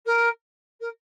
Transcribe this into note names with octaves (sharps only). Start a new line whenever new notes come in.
A#4
A#4